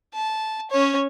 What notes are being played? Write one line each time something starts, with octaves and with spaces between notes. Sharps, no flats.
A5
C#4 C#5